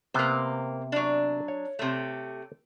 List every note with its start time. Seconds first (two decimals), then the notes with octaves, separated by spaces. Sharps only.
0.14 C3 A#3 B3 C5
0.92 F#3 D4
1.48 C#5
1.79 C3 A3